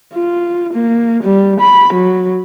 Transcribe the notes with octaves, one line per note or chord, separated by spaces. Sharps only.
F4
A#3
G3
B5
F#3